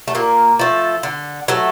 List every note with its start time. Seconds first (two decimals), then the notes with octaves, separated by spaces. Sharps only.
0.08 A3
0.15 A#2 A#3
0.59 F3 A3
1.03 D3
1.48 F#3 A3